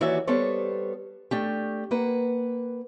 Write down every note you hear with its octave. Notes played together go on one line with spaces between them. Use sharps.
D#2 E3 F#4 C#5 D5 E5
G3 B3 A4 C5 C#5
A3 D4 G4
A#3 B4 F#5